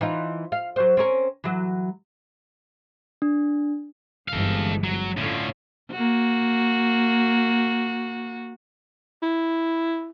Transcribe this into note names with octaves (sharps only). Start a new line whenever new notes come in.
E3 D#4 F4
F5
F#3 C5
C4 C#4 A#4
E3 F#3
D4
G1 G#2 E3 A4 F5
F#3
A2 D3 C#4 F4 A4
A#3 F#4
E4